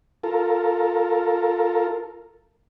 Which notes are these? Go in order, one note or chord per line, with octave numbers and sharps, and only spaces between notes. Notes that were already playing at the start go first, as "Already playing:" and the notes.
F4 A4 A#4